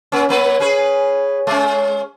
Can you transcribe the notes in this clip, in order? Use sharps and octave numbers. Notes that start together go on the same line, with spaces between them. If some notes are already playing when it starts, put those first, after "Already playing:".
A#3 C#4
F#3 A#3 B4
C#4 G#4 B4
G#3 C#4